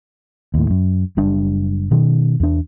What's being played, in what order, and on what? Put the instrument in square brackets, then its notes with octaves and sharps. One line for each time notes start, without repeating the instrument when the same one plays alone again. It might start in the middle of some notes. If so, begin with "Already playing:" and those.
[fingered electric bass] D#2 A2
F#2
F#1 G3 D4
B2 D#3
E2 D4